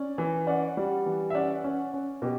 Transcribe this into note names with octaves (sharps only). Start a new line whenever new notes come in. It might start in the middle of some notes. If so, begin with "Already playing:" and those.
Already playing: C#4 D5
E3
C#4 D5 F#5
G3
E3
E5
C#4 D5 F#5
C#4
C#4
B2 G4